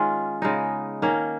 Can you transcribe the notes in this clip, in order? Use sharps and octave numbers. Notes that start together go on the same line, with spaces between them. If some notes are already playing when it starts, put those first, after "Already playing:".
Already playing: D#3 G#3 C#4 F4
C#3 G#3 B3 D#4
D#3 A#3 C#4